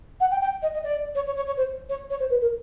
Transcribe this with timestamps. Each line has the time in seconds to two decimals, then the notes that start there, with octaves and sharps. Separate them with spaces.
0.20 F#5
0.31 G5
0.41 G5
0.62 D#5
0.73 D#5
0.84 D5
1.15 C#5
1.26 C#5
1.36 C#5
1.47 C#5
1.57 C5
1.89 C#5
2.10 C#5
2.20 C5
2.30 B4
2.41 A#4